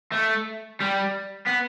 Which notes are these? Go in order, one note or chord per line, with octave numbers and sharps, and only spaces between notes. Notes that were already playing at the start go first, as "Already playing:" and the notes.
A3
G3
B3